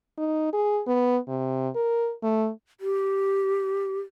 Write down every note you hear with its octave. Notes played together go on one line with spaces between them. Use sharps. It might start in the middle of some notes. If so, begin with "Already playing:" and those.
D#4
G#4
B3
C3
A#4
A3
G4